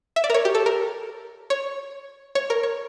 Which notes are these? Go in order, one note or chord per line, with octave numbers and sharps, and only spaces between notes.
E5
D5
A#4
C#5
G4
A4
A#4
C#5
C#5
A#4
C#5